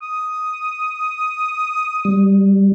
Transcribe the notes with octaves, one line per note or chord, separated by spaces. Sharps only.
D#6
G3